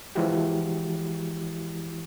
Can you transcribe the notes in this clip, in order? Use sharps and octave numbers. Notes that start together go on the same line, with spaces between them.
E3 F3 G#3 E4 F#4 G4